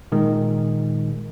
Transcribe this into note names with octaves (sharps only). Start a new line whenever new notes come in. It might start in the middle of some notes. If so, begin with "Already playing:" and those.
A#2 D#3 G#3